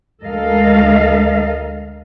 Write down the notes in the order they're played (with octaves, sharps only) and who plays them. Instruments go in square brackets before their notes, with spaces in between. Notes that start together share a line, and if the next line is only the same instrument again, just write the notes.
[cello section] D2 G#3 A4 A#4 D#5 F5